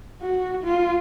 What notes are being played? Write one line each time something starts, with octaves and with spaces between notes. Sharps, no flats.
F#4
F4